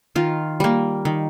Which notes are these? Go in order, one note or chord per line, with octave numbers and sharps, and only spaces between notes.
D#3 F4
G3 A#3
D#3